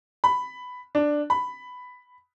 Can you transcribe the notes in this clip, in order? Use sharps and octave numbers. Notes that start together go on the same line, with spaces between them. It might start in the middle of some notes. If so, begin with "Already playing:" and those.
B5
D4
B5